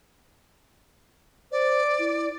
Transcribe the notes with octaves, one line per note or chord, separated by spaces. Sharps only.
C5 D5
E4